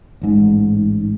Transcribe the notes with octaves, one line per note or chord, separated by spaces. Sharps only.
A1 G#2